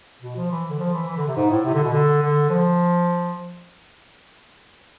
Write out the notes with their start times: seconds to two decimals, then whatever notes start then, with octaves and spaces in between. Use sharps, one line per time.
0.22 B2
0.36 F3
0.51 E3
0.69 D3
0.79 F3
0.93 E3
1.08 E3
1.17 D3
1.27 C3
1.37 G#2
1.50 A2
1.65 C3
1.74 D3
1.84 B2
1.93 D3
2.22 D3
2.50 F3